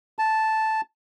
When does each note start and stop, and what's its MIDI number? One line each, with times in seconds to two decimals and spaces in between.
0.19 0.81 81